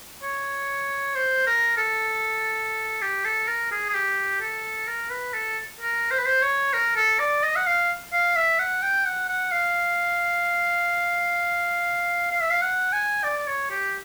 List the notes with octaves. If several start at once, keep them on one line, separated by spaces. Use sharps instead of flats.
C#5
C5
A#4
A4
G4
A4
A#4
G#4
G#4
G4
A4
A#4
B4
A4
A#4
C5
B4
C5
C#5
A#4
A4
D5
D#5
F#5
F5
F5
E5
F#5
G5
F#5
F#5
F5
F5
E5
F5
F#5
G#5
D5
D5
C#5
G4